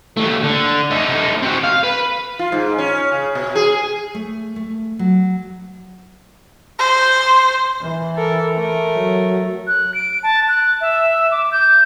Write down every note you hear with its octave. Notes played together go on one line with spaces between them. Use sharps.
D#2 A3
D3
A3 D#4
C4 F#4
F5
B4
F4
G#2
C#4
C#3
B2
G#4
A3
A3
F#3
C5
E3
A4 A#4
A3 A#4
F#3
F#6
D7
A5
F#6
E5
D6
G6